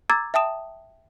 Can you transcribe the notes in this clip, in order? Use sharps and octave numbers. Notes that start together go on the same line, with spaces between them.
A#5 D6 E6 G#6 A6
E5 G5 A5 D#6 E7